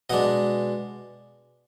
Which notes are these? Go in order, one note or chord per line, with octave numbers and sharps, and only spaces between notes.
B2 G#3 D4 D#5 F#5